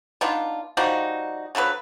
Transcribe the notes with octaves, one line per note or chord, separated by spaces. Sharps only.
B3 D4 D#4 F4
F3 G3 D#4 F#4
D3 F3 F#3 B4